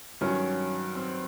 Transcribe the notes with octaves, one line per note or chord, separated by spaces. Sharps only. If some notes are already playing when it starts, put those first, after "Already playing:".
G2 D#3 F#3 C#4
C4